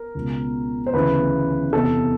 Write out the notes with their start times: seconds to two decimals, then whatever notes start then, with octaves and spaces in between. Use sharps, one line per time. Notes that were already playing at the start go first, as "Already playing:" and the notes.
Already playing: A#4
0.15 C#2 B2
0.86 C5
0.94 D2 C#3 E3 B4
1.73 E2 C3 E3 A4